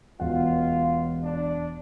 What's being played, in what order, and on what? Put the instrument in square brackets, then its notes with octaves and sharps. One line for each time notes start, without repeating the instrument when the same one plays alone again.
[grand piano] E1 F#5 [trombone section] C#2 F4
[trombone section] D4